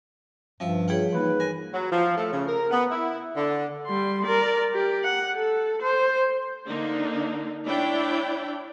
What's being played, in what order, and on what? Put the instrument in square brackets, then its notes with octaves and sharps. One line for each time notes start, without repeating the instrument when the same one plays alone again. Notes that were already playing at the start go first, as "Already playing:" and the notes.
[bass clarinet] G2 [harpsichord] F3 E5 [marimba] G3 F5 [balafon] C#4
[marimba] F4 G#4 C#5 [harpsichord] F#5 G5 B5
[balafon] E3 A#3 D#4 [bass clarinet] B4
[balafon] A#4 [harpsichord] G#5 [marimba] A#6
[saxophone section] F#3
F3
A3
C#3
A#4
B3
E4
D3
[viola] G3 C6
A#4 D5
G4
F#5
A4
C5
[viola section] D3 A#3 D4 D#4
D4 E4 C#5 D5 G5